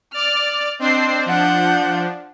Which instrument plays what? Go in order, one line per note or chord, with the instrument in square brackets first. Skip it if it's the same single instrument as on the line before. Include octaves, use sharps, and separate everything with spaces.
[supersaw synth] D5 [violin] F6
[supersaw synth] C4 D4 C5 [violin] D#5 C7
[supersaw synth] F3 D4 [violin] F#5 G6